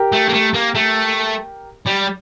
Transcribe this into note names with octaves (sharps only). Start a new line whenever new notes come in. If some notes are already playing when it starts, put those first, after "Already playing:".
Already playing: G4 A#4
A3
A#3
A3
A#3
A3
G3